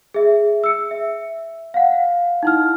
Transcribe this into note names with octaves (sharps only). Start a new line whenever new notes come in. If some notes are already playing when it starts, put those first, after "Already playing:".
G#4 E5
E6 C#7
E5
F5 F#5
D#4 E4 F6